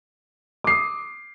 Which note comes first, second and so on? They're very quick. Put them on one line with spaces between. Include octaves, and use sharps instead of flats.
D6 C7 D#6